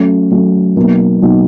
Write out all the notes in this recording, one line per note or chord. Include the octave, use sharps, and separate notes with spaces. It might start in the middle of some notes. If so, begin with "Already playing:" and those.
Already playing: F#3 A3 C#4
F#3 A3 C#4
B2 F#3 A#3 D#4
B2 F#3 A#3 D#4